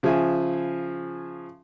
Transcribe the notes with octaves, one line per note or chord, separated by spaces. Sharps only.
C#3 F3 G#4 E5 G#5